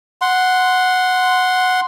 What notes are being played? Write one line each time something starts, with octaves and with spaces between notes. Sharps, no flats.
F#5 C6